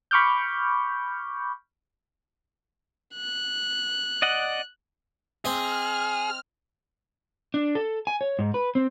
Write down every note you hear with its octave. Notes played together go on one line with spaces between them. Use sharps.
B5 C#6 D6 F6 G6
F#6
D5 D#5 F#5
C4 G#4 D#5 F6
D4
A4
G#5
C#5
G#2
B4
C4